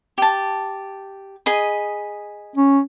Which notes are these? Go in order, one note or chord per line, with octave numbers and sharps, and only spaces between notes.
G4 A5
G#4 D#5 B5
C#4